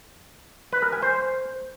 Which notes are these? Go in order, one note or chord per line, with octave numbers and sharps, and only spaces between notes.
B4
A#4
G#5
C5